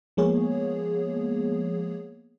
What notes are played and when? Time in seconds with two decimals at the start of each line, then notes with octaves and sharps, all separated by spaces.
0.17 F3 G#3 A#3 B3 G#4 C#5